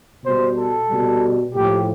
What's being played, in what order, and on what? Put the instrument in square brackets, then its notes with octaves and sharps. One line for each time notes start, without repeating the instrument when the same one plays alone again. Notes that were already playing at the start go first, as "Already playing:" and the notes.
[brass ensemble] B2 G3 C5
A4
B2 G3
A2 F3 G4